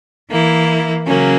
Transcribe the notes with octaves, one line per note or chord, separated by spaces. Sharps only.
E3 A#3 E4
C#3 F#3 A#3 C#4